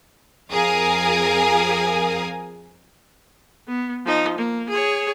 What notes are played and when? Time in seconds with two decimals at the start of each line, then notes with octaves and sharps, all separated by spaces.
0.50 F2 G#4 A#4 F5 G#5 D#6
3.68 B3
4.05 F3 D#4
4.38 A#3
4.69 G#4 C#5